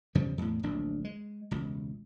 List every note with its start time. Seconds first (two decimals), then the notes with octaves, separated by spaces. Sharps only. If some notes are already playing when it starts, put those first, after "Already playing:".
0.15 E2 C#3 F3 G3
0.38 E2 A2
0.63 D1 A#1 D4
1.05 G#3
1.51 E1 C#2